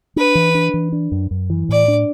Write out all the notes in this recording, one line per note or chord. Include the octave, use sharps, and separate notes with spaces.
D4 B4
E3
D4
E3
D4
F#2
F#2
E3
A2 D5
D4